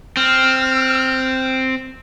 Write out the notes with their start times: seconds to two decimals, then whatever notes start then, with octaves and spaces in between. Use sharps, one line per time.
0.17 C4 F6